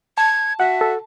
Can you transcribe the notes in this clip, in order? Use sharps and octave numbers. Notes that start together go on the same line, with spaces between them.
A5 G#6
F#4 E5 F#5
A4